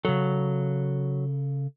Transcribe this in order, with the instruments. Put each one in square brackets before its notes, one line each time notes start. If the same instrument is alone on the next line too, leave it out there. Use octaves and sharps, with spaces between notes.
[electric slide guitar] C#3 A4 [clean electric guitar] F#3